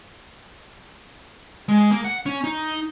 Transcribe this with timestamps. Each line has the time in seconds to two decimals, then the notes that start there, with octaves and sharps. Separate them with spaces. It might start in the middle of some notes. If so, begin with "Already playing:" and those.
1.69 G#3
1.91 A#3
2.05 F#5
2.26 C#4
2.44 D#4